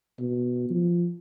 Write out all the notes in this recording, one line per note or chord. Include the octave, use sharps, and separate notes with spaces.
B2
F3